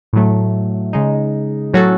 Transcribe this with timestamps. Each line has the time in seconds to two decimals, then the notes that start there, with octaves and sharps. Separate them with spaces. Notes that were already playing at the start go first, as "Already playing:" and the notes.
0.13 A2 F#3 A3
0.93 C#3 G#3 D#4
1.73 A2 F#3 C#4 F#4 A4